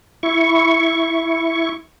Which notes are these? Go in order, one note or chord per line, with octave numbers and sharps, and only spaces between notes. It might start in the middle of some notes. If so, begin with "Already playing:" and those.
E4 C#6